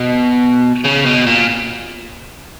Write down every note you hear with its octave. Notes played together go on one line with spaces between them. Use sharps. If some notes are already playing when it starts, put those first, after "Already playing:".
Already playing: B2
C#3
B2
A#2